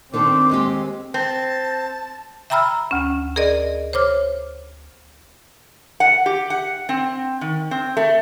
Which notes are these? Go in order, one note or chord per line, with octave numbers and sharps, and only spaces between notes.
D#3 C4 D4 A4 C6 D6
D#2 G#3 G4
C4 A5
E5 G5 A#5 B5 E6 F6
D2 C#4
G#4 A#4 D5 D#5
C5 C#5 D6 F6
F#5
G4
F#5
C4
D#3
C4
A3